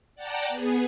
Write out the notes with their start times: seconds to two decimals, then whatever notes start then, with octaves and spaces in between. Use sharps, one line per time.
0.15 D5 F#5 G5 A5 A#5
0.49 B3 G#4